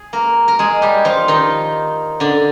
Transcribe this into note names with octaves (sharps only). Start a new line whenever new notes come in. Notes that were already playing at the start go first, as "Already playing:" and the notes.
Already playing: G#4
A#3 A#4
A#4
G#3 G#4
G3 G4
F3 F4
D#3 D#4
D3 D4